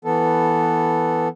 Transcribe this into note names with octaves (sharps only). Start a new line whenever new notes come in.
E3 B3 A4